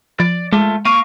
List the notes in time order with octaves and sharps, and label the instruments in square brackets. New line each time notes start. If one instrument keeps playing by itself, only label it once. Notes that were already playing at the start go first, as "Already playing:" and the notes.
[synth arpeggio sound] F3 [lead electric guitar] D5
[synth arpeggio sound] G#3 [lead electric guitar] A3 F4
[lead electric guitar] A#3 F5 [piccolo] C#6 [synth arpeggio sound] D#7